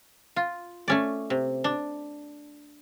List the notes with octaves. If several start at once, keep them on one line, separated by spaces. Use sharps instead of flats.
F4
A3 C#4 D5
C3
D4